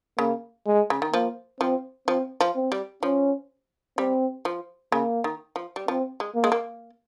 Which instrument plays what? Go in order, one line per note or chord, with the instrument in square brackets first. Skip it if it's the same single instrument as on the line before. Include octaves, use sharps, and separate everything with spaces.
[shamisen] C#3 [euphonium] A#3
[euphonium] G#3
[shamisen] C#3
D#3
[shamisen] F3 [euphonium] A#3
[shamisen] F3 [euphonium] C4
[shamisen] F3 [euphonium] C4
[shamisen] F3
[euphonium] C4
[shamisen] G3
[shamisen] F3 [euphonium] C#4
[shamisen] G3 [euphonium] C4
[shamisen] F3
[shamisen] C#3 [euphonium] A#3
[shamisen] D#3
F3
G3
[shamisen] F3 [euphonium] C4
[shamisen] G#3
[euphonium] A#3
[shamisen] G#3
A#3